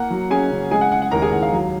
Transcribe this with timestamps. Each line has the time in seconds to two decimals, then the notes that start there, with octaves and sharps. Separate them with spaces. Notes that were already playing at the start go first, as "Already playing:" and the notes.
Already playing: A#3 F#5
0.10 F#3
0.30 C#4 G#4 G#5
0.51 C#3
0.71 G#3 G#4 G#5
0.81 F#5
0.92 C#3 F#5
1.02 F#5
1.11 D#2 A#4 A#5
1.22 G#4 G#5
1.32 D#2 F#5
1.43 F5
1.52 F#3